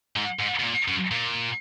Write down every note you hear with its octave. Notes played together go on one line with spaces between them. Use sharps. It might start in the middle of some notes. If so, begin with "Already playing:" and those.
G#2
G#2
B2
A#2
F#2
A#2